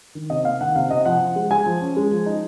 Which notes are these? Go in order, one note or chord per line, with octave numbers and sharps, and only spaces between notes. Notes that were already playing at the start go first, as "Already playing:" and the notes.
D#3
C3 D#5
A#3 F5
D#3 F#5
C3 F5
C3 D#5
F3 F#5
F3
G#3
G#3 G#5
F3
C#4
G#3
F3
D#4